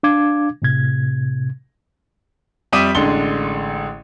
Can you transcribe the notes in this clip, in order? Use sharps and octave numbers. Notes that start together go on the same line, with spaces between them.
D4 F5 D6 G#6
A2 C3 G#6
F2 G3 E5 D6 D#6 D#7
A1 D3 G#3 D4 C6 G7